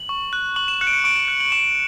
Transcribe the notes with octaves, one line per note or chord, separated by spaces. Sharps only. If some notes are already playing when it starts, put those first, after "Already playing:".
Already playing: F#7
C#6
F#6
C#6 F#7
E7
F#6 C#7
D7
C#7
C#6 D7
E7
F#6
F#7
C#6 E7